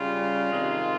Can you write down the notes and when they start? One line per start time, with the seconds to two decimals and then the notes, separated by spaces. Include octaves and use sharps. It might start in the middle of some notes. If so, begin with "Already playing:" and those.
Already playing: C#3 G3 F4
0.51 C3 D#3 G#3